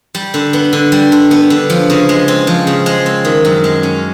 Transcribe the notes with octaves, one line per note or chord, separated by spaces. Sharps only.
G3
D3
B3
D3
G3
D3
B3
D3
F3
C#3
G#3
C4
F3
C#3
G#3
C4
D#3
F#2
G#3
C#4